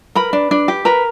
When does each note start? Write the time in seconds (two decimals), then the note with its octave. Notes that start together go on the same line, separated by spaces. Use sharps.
0.15 A#4 B4 B5
0.33 D4
0.51 D4
0.68 G4
0.85 A#4 B4 A#5